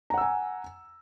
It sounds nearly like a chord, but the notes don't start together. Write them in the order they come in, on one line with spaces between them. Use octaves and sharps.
A#5 F#5 E6 G#5